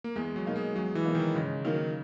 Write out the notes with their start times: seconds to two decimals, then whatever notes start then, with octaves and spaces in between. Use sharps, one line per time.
0.04 A#3
0.16 E2 G#3
0.36 F#3
0.45 B2 A#3 D#4
0.56 G#3
0.76 E2 F#3
0.95 E3
1.05 B2 A#3 D#4
1.15 D#3
1.35 G#2 C#3
1.65 D#3 F#3 A#3